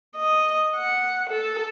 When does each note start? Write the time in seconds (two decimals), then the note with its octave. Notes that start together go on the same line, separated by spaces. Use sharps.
0.17 D#5
0.76 F#5
1.29 A4